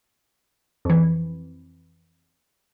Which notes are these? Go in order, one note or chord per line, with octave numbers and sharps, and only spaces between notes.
F2 E3